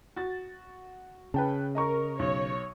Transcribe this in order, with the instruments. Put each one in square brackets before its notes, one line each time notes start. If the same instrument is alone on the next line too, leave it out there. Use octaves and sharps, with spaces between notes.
[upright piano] F#4 A6
[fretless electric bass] C#3 [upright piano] B4 G5 A5
[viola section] A#4 [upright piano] D#5 A#5 C#6
[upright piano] B1 [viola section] C#5